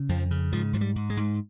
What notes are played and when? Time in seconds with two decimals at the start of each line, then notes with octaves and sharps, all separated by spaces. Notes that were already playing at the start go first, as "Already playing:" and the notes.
Already playing: C#3
0.09 F2 F3
0.31 C#3
0.52 G#2 F3
0.73 G#2 F3
0.81 G3
0.96 G#2
1.10 G#3
1.17 G#2